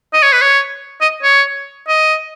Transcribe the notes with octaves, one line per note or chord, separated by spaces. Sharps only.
D#5
C#5
B4
C#5
D#5
C#5
D#5